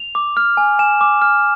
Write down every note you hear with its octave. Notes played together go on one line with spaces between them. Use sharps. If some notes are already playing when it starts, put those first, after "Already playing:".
Already playing: F7
D6
F6
G#5
G#5 E7
D6
F6